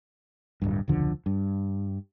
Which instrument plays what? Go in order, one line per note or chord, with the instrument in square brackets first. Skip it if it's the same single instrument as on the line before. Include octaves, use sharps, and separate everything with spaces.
[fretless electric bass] D1 G1 G2
E1 C#2 D3 F3
G2